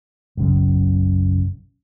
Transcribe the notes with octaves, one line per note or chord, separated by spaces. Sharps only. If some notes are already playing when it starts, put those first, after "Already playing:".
F#1 B1 F#2 C#3